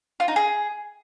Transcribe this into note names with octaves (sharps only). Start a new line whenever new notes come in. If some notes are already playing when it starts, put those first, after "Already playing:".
F4
D#4
G#4